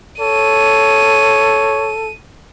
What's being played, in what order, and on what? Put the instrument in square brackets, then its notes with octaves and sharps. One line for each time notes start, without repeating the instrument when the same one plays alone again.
[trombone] A4 [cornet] C#5 [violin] D#7